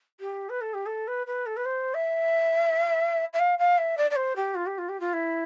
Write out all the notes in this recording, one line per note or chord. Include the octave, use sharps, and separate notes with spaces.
G4
B4
A4
G4
A4
B4
B4
A4
B4
C5
E5
E5
F5
F5
E5
D5
D5
C5
G4
F4
G4
F4
G4
F4
E4